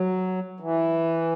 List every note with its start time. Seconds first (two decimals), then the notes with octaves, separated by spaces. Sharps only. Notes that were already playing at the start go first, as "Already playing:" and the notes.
Already playing: F#3
0.60 E3